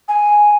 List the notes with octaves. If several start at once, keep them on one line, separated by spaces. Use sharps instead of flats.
G#5